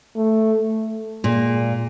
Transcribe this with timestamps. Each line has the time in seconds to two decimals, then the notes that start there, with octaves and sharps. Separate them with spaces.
0.17 A3
0.61 A3
1.24 A#2 G#3